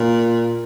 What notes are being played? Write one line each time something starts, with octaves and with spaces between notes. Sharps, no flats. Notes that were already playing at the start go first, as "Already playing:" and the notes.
Already playing: A#2